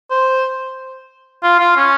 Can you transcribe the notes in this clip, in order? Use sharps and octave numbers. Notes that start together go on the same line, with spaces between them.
C5
F4
F4
C#4